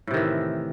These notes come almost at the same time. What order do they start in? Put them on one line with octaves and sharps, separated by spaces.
A2 C3 D#3 E3